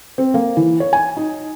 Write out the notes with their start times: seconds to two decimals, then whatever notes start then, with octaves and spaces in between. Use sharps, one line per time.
0.18 C4
0.34 A#3
0.57 E3
0.80 C#5
0.93 G#5
1.17 D#4